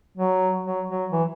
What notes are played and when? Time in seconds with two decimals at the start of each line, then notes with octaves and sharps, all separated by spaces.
0.18 F#3
0.65 F#3
0.89 F#3
1.12 E3